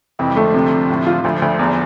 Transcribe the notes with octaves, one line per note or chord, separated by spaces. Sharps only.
F2 C3 E3
G3
D3 F3 A3
C3
C3
A2
F4
D2 D3 F3
D2
E2